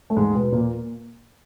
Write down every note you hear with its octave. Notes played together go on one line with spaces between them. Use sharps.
A3
G#2 G#3
B2 B3
A#2 A#3